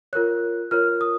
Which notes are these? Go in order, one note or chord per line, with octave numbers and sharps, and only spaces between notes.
F4 A#4 C#5 F#6
F4 A#4 C#5 F6
D#6